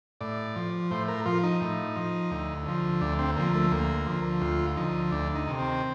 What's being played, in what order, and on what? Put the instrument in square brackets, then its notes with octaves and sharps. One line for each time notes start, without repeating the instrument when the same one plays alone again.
[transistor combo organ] A2 D5
F3
A2 C5
A#4
F3 F4
D#4
A2
F3
D2
D3 F3
D2 D4
C4
D3 F3 A#3
A3
D2 A#3
D3 F3
D2 F4
D3 F3 D#4
D2 D4
D#4
C3 D#3
C4